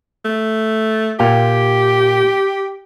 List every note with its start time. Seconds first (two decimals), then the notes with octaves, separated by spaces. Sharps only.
0.25 A3
1.19 A#2 G4 F5 G5